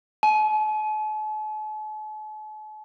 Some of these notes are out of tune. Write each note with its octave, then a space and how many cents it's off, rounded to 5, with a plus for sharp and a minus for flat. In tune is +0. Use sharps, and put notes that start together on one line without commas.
A5 -45